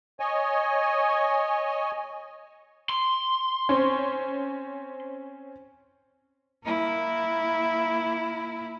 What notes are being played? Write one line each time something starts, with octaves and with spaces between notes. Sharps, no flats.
C#5 D#5 G#5
C6
C4 C#4
A#3 E4